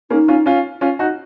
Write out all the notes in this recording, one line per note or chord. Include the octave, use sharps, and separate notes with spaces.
A#3 C#4 D#4
C#4 F4
C#4 F4
C#4 F4
D#4 F#4